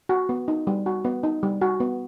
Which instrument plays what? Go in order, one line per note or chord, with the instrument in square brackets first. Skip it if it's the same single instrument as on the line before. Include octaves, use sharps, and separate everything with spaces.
[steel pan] F#4
B3
D#4
G3
F#4
B3
D#4
G3
F#4
B3